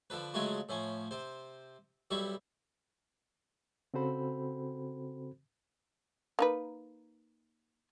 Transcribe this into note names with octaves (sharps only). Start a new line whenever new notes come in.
D3 F3 B4
C#3 F#3 G#3 A3 F4 F#4
A2 F3 C#4
C3 C5
B1 G3 E4 C#6
C#3 C4 F#4 A4 C5 B5
A#3 D#4 B4